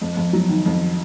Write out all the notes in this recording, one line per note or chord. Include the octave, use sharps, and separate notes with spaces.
F2
F2
F#3
D#3
F2